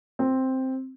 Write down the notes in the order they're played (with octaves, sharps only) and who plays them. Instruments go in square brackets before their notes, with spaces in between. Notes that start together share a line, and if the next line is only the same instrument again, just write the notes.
[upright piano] C4